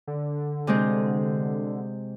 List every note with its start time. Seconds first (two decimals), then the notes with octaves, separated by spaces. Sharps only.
0.07 D3
0.67 C3 G#3 C4